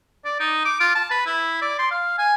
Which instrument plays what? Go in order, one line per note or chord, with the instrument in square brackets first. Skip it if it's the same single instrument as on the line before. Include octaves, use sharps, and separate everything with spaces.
[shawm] D5
D#4
D6
F4
A5
B4
E4
D5
C6
F5
G#5